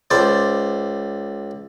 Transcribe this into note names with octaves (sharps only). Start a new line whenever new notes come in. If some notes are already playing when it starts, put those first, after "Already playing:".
C#2 C5 D5